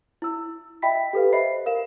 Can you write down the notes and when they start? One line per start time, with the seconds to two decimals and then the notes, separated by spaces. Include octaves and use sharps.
0.22 E4 E6
0.82 D#5 E5 G5 B5 B6
1.13 G4 A4 B4 F5
1.32 C5 D#5 E5 B5 C7
1.66 A#4 F5 E7